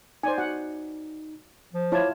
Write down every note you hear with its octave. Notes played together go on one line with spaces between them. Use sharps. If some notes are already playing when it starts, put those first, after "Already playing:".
D#4 C5 D5 G#5
F#4 F#5
F3
E4 F4 C#5 A5 D6 G#6